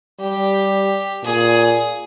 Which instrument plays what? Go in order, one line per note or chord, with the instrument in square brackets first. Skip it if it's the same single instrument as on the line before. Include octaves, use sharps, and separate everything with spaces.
[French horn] G3 [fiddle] G4
[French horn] A#2 [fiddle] G#4